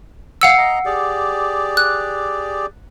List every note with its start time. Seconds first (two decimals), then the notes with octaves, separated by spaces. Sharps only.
0.41 F5 F#5 E6
0.58 D#5 A#5
0.86 G4 G#4 D5
1.77 F#6